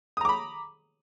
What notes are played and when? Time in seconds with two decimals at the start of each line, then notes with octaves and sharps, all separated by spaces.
0.17 D#6
0.21 A#5
0.25 D6
0.29 B5